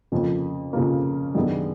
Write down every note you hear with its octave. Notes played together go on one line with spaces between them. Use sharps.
F2 C#3 F3 A#3
F2 C#3 F3 A#3
F#2 D#3 G#3 B3 D4